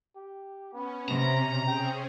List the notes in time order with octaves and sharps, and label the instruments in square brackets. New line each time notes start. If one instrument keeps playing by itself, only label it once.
[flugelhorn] G4
[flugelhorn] B3 [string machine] C#4
[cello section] C3 [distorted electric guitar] A#5
[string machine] C4 C#4 G#4 [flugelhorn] G5